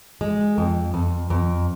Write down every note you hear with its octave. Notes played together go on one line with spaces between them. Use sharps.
G#3
F2
F2
F2